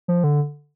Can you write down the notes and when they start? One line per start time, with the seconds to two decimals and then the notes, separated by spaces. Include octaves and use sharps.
0.08 F3
0.24 D3